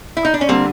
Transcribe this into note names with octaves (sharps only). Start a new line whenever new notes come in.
E4
D#4
D4
C#4
D3 G3 A#3 C4